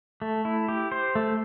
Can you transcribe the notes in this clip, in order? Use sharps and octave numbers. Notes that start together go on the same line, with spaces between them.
A3
E4
G4
C5
A3